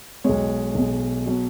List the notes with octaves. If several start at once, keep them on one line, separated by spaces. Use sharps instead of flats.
B1 B2 G#3 C#5
B1 B2 G#3
B2 F#3